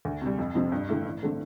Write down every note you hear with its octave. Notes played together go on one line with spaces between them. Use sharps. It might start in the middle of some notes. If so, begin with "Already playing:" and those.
D2
C3 G3
F2
C3 F3 C4
G2
D3 A3 E4
A1
D3 A3 C4